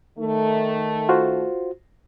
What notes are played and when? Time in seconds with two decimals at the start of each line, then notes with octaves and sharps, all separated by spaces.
0.19 D#3 A3
1.09 F4 F#4 C5